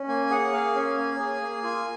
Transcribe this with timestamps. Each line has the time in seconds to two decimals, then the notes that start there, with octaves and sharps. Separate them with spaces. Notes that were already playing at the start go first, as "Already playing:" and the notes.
Already playing: C#4
0.08 A#3 G#5
0.31 G#4 F#5
0.52 A#3 F5
0.75 C#4 G#5
0.97 A#3
1.19 G#4
1.41 A#3
1.63 F4